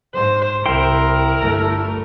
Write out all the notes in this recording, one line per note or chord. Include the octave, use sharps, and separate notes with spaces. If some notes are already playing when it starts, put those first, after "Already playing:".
G#2 C5
C2 E4 A#4 G5 C6
G1 A3